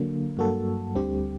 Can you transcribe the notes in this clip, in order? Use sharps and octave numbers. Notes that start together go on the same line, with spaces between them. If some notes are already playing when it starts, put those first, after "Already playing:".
Already playing: D3 F#3 A#3
G2 F#3 A#3 F#4 A4
D2 D3 G3 C4 G4